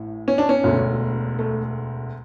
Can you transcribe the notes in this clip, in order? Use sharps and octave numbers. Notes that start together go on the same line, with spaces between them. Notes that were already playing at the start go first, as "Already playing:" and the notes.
Already playing: A1 A2
C#4
D4
C#4
E1 D2 D3
A3